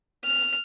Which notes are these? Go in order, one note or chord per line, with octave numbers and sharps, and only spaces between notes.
F6